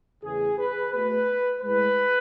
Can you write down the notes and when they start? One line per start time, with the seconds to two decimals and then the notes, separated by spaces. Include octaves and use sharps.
0.23 E2 C#3 E3 A3 G#4
0.58 B4
0.92 B2 A3 B4
1.61 A2 G#3 B4